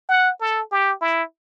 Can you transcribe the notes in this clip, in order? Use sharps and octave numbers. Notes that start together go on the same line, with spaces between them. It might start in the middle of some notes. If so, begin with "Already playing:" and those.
F#5
A4
G4
E4